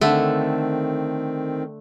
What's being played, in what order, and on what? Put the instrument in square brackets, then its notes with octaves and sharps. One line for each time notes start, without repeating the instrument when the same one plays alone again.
[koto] D3 A3 [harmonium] D#3 C4